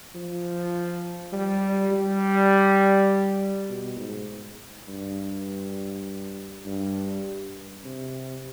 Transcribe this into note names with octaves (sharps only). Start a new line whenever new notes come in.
F3
G3
G3
B2
G#2
G2
G2
C3